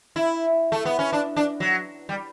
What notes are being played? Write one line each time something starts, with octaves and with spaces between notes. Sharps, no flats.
E4
A3
B3
C#4
D4
D4
F#3
G3